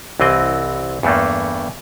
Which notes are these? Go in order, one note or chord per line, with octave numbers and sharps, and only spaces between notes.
C2 E3 C4 D#5
E2 G2 A3 A#3